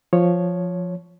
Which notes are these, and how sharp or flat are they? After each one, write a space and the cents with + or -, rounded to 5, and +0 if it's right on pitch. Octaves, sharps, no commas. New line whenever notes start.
F3 +0 C#5 +0